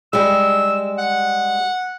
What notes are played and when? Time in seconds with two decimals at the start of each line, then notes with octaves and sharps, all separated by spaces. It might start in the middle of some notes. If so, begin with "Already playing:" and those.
0.13 G3 G#3 E6
0.98 F#5